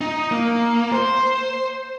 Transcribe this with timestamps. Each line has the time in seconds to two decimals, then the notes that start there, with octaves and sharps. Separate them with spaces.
0.01 D#4
0.31 A#3
0.92 C5